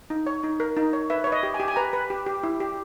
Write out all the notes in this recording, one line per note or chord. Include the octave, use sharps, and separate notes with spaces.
D#4
C#5
D#4
A#4
D#4
C#5
B4 E5
B4 C#5
D#5
G4
G#5
G4
G#5
B4 A#5
B4
G4
G4
E4
G4